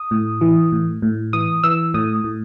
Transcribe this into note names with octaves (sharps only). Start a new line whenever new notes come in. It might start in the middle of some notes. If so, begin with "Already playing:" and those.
Already playing: D#6
A2
E3
A2
A2
E3 D#6
E3 E6
A2 D#6
A2